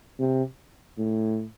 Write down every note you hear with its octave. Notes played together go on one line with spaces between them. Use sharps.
C3
A2